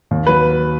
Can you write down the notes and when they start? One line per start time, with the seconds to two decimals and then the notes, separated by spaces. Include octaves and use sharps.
0.11 D#2
0.27 F#3 B4